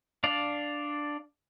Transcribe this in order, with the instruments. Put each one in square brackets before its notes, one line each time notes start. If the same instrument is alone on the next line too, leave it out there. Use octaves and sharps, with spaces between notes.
[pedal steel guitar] D4 D5 F5